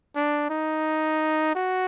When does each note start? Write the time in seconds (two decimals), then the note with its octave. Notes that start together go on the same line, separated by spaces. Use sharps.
0.16 D4
0.50 D#4
1.55 F#4